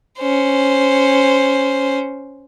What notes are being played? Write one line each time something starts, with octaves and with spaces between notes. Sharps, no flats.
C#4 C5